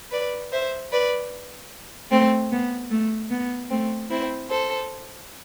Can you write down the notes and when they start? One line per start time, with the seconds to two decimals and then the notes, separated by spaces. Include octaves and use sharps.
0.11 B4 D5
0.51 C5 E5
0.91 B4 D5
2.10 A3 C4
2.51 B3
2.90 A3
3.30 B3
3.70 A3 C4
4.10 C4 E4
4.49 A4 C5